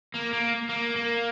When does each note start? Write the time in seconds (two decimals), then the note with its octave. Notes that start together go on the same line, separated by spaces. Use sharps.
0.14 A#3
0.33 A#3
0.69 A#3
0.96 A#3